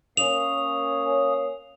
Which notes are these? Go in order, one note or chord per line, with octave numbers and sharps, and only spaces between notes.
A#3 C#4 F5 D#6 F7